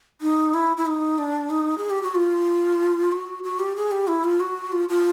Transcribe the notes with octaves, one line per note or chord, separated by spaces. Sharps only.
D#4
E4
E4
D#4
D4
D#4
G#4
G4
F#4
F4
F#4
F#4
G4
G#4
G4
E4
F4
F#4
F4
F4